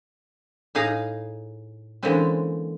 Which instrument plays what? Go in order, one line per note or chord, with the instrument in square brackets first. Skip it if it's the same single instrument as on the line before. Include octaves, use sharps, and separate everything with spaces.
[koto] A2 D#4 G#4 F5 A#5
D3 E3 G#3 A#3 C4 C#4